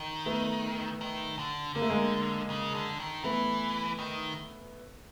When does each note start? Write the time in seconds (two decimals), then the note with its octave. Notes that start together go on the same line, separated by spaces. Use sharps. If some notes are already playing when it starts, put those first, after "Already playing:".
Already playing: D#3
0.26 A3 B3
1.01 D#3
1.39 D3
1.75 D3 A#3
1.82 A3
1.90 G#3 A#3
2.50 C#3
2.75 D3
3.00 D#3
3.24 E3 A3 B3
3.99 D#3